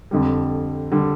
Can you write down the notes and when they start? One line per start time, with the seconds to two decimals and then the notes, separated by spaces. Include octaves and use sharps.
0.11 F2 D3 G3
0.92 D3 G3